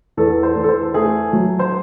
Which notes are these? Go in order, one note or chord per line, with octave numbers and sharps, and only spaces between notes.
E2 A4
C5
E2
A4
C5
A3 G#4
F#3
C5